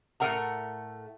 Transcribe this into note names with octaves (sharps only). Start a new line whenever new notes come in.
A2 A3 A4 A#4 F#5 A#5